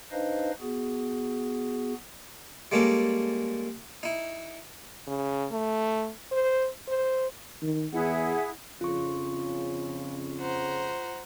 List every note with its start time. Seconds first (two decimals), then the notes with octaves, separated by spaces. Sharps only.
0.11 D4 D#4 B4 C5 D#5 F5
0.61 B3 F#4 G#4
2.72 G3 G#3 A#3 C#4 A4 D5
4.03 D#4 E4
5.07 C#3
5.52 A3
6.32 C5
6.88 C5
7.62 D#3
7.92 E2 E4 G#4 F#5
8.81 F2 C#3 F4 C#6
10.40 C5 F#5 A#5